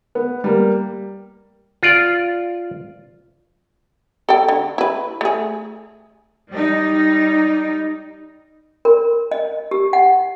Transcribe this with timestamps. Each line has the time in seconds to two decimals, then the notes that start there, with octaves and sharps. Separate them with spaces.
0.15 B3
0.44 G3 A#3
1.83 F4 D5
4.29 A4 G5
4.48 D3
4.78 E4 B4
5.21 A3 G#4
6.51 G3 D#4
8.85 A#4
9.31 D#5
9.71 G4
9.93 F#5